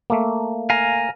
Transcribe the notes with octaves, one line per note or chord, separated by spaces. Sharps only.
A3 A#3
F5 G#5 A#5